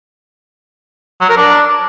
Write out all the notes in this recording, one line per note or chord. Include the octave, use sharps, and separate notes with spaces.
F#3
A#4
D4